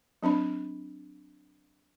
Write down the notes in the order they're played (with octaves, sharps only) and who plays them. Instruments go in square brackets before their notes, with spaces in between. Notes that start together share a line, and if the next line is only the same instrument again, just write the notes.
[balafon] F#3 C4 D4 B5